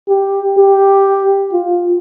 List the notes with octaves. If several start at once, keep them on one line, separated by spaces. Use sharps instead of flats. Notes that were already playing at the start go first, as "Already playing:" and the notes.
G4
G4
F4